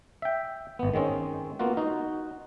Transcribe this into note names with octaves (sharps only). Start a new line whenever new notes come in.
E5 G5
G#1 B3
D#3 G#3 C4 C#4
A#3 B3 F4 F#4
D#4 F#4